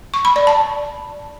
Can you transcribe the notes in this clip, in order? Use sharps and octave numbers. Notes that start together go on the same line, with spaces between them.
C#6
B5
D5
A5